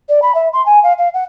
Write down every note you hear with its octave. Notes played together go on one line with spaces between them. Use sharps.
D5
B5
E5
C6
G#5
F5
F5
F#5